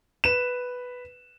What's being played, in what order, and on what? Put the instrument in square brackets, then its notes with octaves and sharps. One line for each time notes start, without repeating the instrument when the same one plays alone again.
[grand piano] B4 E7